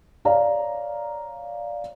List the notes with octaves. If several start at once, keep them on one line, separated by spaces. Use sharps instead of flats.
C#5 D5 F5 A#5